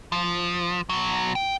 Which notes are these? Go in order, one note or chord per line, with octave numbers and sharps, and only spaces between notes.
F3
B2 F#3
G5